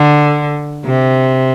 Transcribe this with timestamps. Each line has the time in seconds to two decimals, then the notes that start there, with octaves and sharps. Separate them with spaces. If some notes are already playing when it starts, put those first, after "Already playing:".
Already playing: D3
0.85 C3